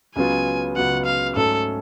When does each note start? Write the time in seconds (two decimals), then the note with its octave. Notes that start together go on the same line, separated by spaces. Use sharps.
0.16 C#2 C#3 F#3 B3 F4 G#5
0.76 C#2 C#3 F#3 B3 F4 F#5
1.06 F5
1.36 G#2 F#3 A3 C#4 A4